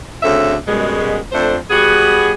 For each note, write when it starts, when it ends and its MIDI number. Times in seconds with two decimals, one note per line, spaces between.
0.23 0.56 38
0.23 0.56 49
0.23 0.56 60
0.23 0.56 69
0.23 0.56 76
0.68 1.18 42
0.68 1.18 47
0.68 1.18 55
0.68 1.18 56
1.32 1.56 41
1.32 1.56 57
1.32 1.56 62
1.32 1.56 72
1.70 2.32 55
1.70 2.32 59
1.70 2.32 66
1.70 2.32 68